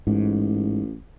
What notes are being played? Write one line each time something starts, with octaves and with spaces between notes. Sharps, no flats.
A1 G#2